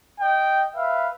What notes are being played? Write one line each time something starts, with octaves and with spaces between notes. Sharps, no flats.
D#5 G5
B4 E5 F5